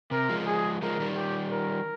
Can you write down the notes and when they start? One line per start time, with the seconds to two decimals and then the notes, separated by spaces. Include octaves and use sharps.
0.11 C3 A#4
0.29 F3 G#3
0.46 G#4
0.82 F3 G#3 A#4
1.00 D#3 G3
1.17 G4
1.52 A#4